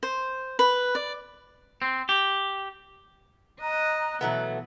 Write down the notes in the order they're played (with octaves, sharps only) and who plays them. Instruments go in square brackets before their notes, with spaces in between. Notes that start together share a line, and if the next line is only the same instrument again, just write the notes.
[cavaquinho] C5
B4
D5
[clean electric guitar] C4
G4
[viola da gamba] D#5 [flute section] A#5 F#6
[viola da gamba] B2 E3 [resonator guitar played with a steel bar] F#3 A3 B3